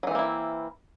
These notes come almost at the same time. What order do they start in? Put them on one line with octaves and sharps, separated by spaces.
F#3 E3 C4 A#3 E4